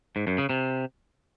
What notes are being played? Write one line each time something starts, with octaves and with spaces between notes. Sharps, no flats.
G#2
F#2
C#3
C3